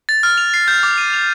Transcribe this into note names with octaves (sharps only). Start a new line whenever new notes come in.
A6
F6
F7
C7
G6
D6
D#7
F7